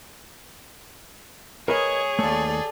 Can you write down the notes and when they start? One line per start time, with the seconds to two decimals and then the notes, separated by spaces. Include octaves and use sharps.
1.68 G#4 A#4 B4 C#5 D#5
2.19 D#2 A3 A4 D5